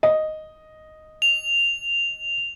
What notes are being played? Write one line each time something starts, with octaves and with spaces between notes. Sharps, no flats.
D#5
F7